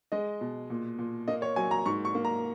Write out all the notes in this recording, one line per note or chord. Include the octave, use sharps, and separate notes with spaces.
G#3 D#5
B2
A#2
A#2
A#3 D#5
C#5
F#3 G#5
A#5
G#2 C#6
C#6
A#3
A#5